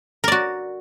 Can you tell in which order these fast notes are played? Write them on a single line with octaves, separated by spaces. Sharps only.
A#4 D5 F#4